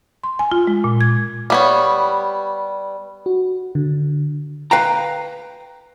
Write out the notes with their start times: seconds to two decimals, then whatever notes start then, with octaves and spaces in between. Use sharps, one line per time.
0.24 C6
0.39 G#5
0.52 F4
0.67 G#3
0.84 A#2
1.01 G#6
1.50 G3 B3 C#5
3.26 F#4
3.75 D3
4.71 B4 F5 G5 A#5